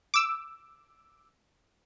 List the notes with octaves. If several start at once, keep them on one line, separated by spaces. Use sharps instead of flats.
D6 E6